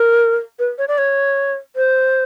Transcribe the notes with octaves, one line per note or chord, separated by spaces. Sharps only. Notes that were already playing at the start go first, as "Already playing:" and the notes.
Already playing: A#4
B4
C#5
D5
C#5
C5